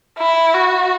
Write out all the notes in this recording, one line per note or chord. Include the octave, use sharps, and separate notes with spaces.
E4
F#4